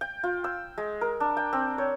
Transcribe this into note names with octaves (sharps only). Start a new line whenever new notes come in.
G5
F4
E6
G#3
A#4
D4
G5
C4
C#5